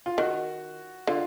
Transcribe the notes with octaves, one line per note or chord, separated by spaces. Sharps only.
F4
D#3 F#4
D3 F4